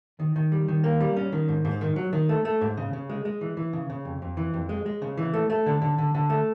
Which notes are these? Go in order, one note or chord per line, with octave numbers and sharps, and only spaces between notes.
D#3
D#3
G3
D#3
A#3
G3
C#4
D#3
G#2
G#2
D#3
F#3
D#3
A3
A3
G#2
C#3
C#3
G#3
G#3
E3
E3
C#3
C#3
F2
F2
E3
F2
G#3
G#3
C#3
E3
A3
A3
D3
D3
D3
D3
A3